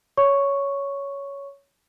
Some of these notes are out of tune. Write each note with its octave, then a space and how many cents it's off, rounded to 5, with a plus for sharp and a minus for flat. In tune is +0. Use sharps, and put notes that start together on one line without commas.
C#5 +10 C#6 +0